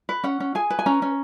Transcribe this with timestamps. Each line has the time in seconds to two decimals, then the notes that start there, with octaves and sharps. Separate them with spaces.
0.09 B4
0.24 C#4 F#5
0.40 C#4
0.55 G#4 G#5
0.70 B4
0.79 G#5
0.86 C#4 A#5
1.02 C#4